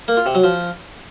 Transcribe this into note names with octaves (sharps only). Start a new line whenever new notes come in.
A#3
F4
C3
F#3
F3